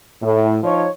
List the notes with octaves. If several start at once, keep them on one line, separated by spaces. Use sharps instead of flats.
A2
F3 D#4 C#5